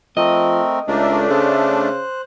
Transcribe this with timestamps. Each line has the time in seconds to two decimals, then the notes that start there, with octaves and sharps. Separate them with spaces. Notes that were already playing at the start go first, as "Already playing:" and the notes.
0.17 F3 A3 C4 A#4 D#5
0.88 C#2 A3 D4 A#4
1.30 C#3 C5 F#6